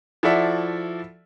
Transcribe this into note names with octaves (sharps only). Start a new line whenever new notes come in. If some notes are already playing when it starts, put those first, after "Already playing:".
F3 E4 F#4 A4 D5 E5